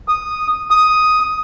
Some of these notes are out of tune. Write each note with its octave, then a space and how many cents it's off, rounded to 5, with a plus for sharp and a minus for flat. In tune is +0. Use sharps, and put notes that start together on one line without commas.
D#6 -5
D#6 +5